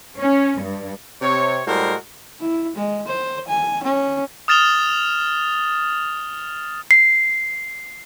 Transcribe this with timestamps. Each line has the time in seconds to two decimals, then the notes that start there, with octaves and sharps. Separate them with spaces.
0.19 C#4
0.59 G2
1.22 C3 C#5
1.67 A2 G3 G#3 F#4 A#4 C5
2.40 E4
2.76 G#3
3.07 C5
3.48 G#5
3.83 C#4
4.48 D#6 F6 A6 E7 F7 G7
6.91 C7